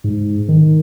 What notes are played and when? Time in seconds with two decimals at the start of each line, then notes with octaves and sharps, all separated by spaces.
0.04 G#2
0.48 D#3